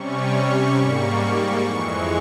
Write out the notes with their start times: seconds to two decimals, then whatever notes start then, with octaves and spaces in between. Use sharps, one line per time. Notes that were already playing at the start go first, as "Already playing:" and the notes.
Already playing: C3 G3 C#4 C#6
0.31 C#6
0.74 G#2 G3 A#3 C#6
1.62 F2 E3 G#3 C#6